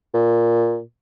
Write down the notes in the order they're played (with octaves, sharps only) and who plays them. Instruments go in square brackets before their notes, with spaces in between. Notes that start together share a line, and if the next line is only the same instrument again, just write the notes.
[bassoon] A#2